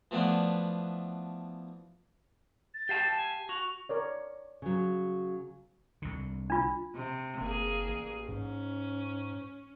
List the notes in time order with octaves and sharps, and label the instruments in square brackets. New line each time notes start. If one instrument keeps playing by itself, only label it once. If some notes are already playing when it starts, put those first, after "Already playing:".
[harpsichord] E3 F3 A3 B3 D4
[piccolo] A6
[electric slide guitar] G4 F5 A5
[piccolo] G#5
[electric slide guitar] F#4 [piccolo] F7
[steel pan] A#4 C#5 D5
[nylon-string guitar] C#3 F#3
[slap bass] C2 D3
[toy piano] D4 F4
[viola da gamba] C3
[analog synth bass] F#1 [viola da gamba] A#3 G#4
[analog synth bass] A1
[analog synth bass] G#2 [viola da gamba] C#4